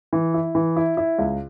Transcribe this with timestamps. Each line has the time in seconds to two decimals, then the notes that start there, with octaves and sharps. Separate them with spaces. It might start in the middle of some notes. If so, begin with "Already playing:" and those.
0.13 E3
0.34 E4
0.55 E3
0.76 E4
0.97 E4
1.19 C#2